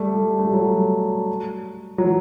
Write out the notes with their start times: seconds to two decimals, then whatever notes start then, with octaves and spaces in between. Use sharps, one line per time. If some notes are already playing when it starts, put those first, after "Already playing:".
Already playing: G3 A3
0.15 G3
0.39 A3
0.46 G3
0.53 F#3
1.98 F#3
2.04 E3